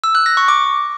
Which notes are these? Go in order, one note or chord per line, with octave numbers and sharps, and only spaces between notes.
E6
F#6
A#6
C#6
D6